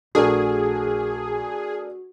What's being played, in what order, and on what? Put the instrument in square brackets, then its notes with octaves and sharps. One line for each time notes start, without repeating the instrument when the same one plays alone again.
[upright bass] A#1 [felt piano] A3 D4 A#4 [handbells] F#4 [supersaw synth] G#4